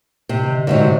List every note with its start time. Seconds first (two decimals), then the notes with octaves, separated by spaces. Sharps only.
0.29 C3
0.46 D3 D#3
0.67 G#2 C3 F#3 D5 E5